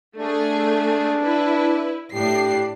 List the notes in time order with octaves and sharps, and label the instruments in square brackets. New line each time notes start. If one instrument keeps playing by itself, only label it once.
[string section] A3 G#4 [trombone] D4
[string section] E4 B4
[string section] A2 D4 C7 [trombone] G4